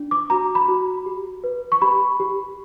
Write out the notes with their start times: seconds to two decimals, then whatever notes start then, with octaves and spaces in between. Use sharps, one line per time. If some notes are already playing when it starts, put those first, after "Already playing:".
Already playing: D4
0.11 D6
0.30 F#4 A#5
0.55 B5
0.68 F#4
1.06 G4
1.44 B4
1.72 C#6
1.82 G4 B5
2.20 G4